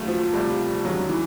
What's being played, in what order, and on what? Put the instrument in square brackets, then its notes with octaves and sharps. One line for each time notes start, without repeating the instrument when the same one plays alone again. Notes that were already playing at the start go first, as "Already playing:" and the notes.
Already playing: [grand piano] D#2 C#3 F#3 A3
[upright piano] F3
[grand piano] C2 C3 F3 A3 [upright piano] G3
[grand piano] D#2 D#3 G#3 C#4 [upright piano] F#3
[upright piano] E3